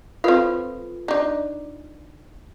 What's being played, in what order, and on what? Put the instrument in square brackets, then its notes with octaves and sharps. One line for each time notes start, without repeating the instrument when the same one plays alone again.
[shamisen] C4 F5 [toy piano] F4 A4 B4
[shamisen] D4 D#4